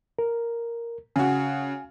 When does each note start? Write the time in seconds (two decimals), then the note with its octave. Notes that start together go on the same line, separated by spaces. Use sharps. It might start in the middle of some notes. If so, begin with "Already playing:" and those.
0.19 A#4
1.16 C#3 F#4 G#5